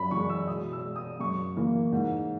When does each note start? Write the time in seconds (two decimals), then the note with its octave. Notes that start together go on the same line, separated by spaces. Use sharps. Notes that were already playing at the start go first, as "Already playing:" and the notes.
Already playing: F#2 B5
0.11 E3 G#3 C#6
0.29 E6
0.48 B2 D#6
0.72 E6
0.84 G#3
0.96 D#6
1.20 F#2 C#6
1.56 E3 A#3
1.92 G#2